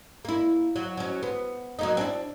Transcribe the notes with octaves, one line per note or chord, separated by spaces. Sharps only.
A#3 E4
F#3
F#3 C#4
B3
F#3 A#3 D#4
C4 D4 E4